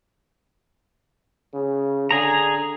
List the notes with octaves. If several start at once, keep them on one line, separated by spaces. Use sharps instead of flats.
C#3
D3 G#4 A#5